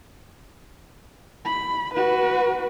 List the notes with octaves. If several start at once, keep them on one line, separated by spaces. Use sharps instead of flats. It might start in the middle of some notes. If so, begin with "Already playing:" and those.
B5
F#4 B4